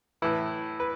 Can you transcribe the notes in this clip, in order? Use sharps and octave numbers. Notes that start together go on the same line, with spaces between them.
A2 E3 E4
B4